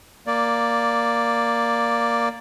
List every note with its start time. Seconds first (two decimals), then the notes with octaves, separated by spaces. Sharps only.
0.27 A#3 D5